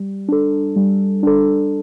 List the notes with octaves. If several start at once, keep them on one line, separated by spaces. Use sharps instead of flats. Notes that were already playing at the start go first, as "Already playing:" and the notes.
Already playing: G3
D4 A4
G3
D4 A4